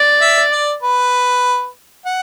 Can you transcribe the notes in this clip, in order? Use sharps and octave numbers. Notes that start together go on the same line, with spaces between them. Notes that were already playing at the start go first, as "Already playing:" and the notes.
Already playing: D5
E5
D5
B4
F#5